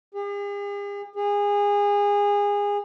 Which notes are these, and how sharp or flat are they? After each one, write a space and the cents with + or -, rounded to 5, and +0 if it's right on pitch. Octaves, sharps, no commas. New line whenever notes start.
G#4 -45
G#4 -25